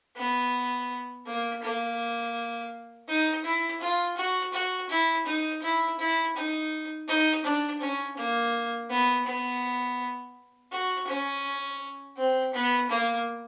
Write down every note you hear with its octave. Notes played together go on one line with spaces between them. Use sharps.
B3
A#3
A#3
D#4
E4
F4
F#4
F#4
E4
D#4
E4
E4
D#4
D#4
D4
C#4
A#3
B3
B3
F#4
C#4
C4
B3
A#3